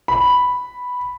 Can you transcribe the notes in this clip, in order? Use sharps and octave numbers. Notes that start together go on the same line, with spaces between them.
B5